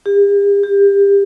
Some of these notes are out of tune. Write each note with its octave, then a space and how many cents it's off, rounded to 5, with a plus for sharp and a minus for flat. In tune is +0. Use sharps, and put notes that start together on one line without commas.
G4 +45
G4 +30